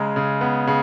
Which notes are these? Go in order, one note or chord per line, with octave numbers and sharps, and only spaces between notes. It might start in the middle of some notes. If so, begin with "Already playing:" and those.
Already playing: C#3 G#3 A#5
C#3
B3
C#3